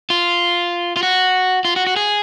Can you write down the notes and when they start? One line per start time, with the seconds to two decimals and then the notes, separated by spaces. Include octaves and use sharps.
0.10 F4
0.96 F4
1.03 F#4
1.65 F4
1.76 F#4
1.87 F#4
1.96 G#4